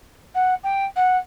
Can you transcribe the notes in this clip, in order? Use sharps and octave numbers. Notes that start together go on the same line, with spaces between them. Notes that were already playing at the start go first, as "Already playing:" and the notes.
F#5
G5
F#5